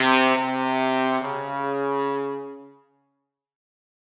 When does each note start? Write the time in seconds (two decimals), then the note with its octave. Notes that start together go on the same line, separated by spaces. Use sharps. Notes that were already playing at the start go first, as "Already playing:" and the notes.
Already playing: C3
0.36 C3
1.21 C#3